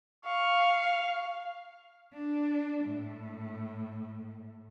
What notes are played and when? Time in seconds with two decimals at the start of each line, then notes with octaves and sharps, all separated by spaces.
0.25 F5 C#6
2.13 D4
2.86 A2